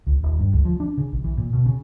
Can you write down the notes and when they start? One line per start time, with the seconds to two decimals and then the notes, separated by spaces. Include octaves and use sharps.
0.07 C#2
0.23 D#1
0.39 G2
0.53 C#2
0.65 F3
0.80 D4
0.97 C#3
1.13 A#1
1.24 E3
1.38 A#2
1.53 B2
1.66 C#3